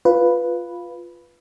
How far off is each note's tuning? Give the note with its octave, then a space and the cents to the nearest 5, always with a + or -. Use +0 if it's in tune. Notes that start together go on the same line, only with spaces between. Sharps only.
F4 +0 B4 +0